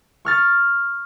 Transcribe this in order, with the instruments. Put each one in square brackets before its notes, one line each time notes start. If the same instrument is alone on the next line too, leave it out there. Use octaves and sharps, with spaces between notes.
[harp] C#6 F6 A6